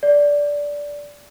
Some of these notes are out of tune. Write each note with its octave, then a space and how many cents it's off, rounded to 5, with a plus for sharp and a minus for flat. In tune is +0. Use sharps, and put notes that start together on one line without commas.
D5 -10